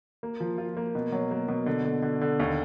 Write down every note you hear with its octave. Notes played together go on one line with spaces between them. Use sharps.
A#3
F3
F4
A#3
B2
F#3
A#3
B2
D3
D3
D3
D3
D#2